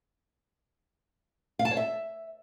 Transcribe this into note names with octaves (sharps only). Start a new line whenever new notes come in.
F5
A5
C#5
E5